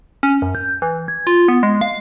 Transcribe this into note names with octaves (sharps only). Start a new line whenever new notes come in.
C#4
F#2
G6
E3
G#6
F4
B3
G#3
F5